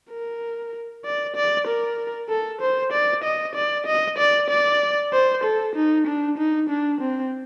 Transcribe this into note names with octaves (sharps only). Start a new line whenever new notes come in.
A#4
D5
D5
A#4
A4
C5
D5
D#5
D5
D#5
D5
D5
C5
A4
D#4
D4
D#4
D4
C4